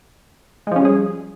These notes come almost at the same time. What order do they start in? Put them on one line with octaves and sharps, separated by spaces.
G#3 F3 C#4 G3 G#4